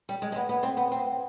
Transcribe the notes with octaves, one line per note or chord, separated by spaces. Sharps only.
G3
G#3
G#3
B3
B3
C4
B3
C4